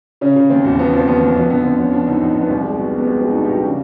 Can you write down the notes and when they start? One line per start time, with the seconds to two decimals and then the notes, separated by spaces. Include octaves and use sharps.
0.21 C#3 C#4
0.36 C#3
0.50 D#2 C4
0.64 E1
0.79 F3 B3
0.94 F3 C4
1.07 D#2 B3
1.21 D#2
1.35 F2 B3
1.50 D3 B3
1.64 D3 C4
1.79 F2 C#4
1.92 F3 D4
2.07 D3 D#4
2.21 F2 D#4
2.35 F2
2.41 B3
2.50 C2 C4
2.64 G#3
2.78 B2
2.92 G#3
2.98 B3
3.07 G#3 C4
3.21 G#3 C4
3.30 D#4
3.35 B2 D4
3.44 G4
3.49 C2 F#4
3.63 C#3